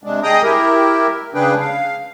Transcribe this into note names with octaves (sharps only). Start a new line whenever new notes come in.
C3 G#3 D4
G#4 D#5 G5 A#5 D#6
E4 G4 A#4
C#3 D4 G#4 B4 G5
F5